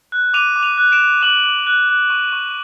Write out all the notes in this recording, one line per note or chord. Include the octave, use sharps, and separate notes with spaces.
F#6
D6 D#7 F7
D6
D#7 F7
F#6
D7 E7
F#6
D6 E7 F#7
D6
F#6
F#6
C#6
C#6